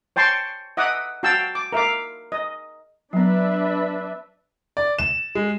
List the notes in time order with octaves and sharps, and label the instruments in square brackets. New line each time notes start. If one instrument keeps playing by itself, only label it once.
[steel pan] C#5 G5 A5 C6 C#6
D#5 E5 F#5 D6 D#6
F#4 F5 G5 A5 E6
D6
A#4 E5 F5 D6
D#5
[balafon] F#3 B3 [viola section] D4 B4 E5
[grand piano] D5
E7
G#3